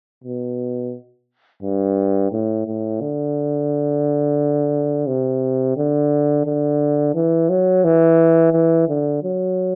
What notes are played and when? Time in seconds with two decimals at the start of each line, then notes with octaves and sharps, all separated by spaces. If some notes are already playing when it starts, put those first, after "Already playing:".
0.24 B2
1.63 G2
2.32 A2
2.66 A2
3.01 D3
5.07 C3
5.77 D3
6.45 D3
7.14 E3
7.49 F#3
7.84 E3
8.53 E3
8.88 D3
9.23 F#3